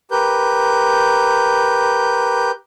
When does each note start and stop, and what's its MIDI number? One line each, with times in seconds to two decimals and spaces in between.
0.11 2.51 67
0.11 2.51 70
0.11 2.51 71
0.11 2.51 91